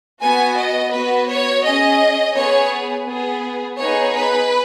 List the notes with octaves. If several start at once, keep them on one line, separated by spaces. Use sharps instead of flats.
B3 F#4 G#5
D#5
B3 F#4 B4
C#5
C#4 G#4 D#5
B3 G#4 C#5
B3 G#4
B3 D#4 G#4 C#5
B4